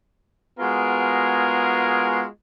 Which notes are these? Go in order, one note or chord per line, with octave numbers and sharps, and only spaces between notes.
G#3 B3 F4 F#4 G#4 A#4